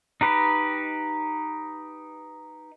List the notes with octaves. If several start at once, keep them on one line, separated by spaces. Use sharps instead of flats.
D#4 G4 B4